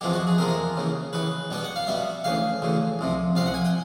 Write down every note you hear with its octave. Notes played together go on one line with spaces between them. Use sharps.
E2 C3 F3 G#3 B3 G4
F#4
G#4
E2 C3 F3 G#3 B3 A#4
D#2 C#3 E3
D#2 C#3 E3 B4
B2 G3 B3 G5
F#5
F5
B2 G3 B3 E5
D2 C#3 E3 F5
D2 C#3 E3
C2 C3 F3
C2 C3 F3 F5
F#5
G#5
G5